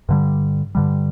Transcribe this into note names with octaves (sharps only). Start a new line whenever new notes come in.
G2 D3 G3
G2 D3 G3